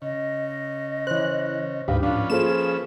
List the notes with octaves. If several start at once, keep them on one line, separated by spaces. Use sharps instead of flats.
C#3 D#5
E3 C5 C#5 F#6
D2 G#2 D3 D#3 G4 B4 F5
A2 F3 C#4 D4 B4 F5
A#3 F4 G#4 A4 C5 E7